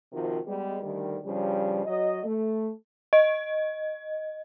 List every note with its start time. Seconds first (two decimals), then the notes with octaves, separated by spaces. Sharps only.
0.12 C3 D#3 F3 F4 F#4 A#4
0.46 G3 G#3 B3
0.82 D2 D#3 G3
1.24 G2 C#3 F3 G3
1.85 F#3 D#5
2.24 A3
3.13 D#5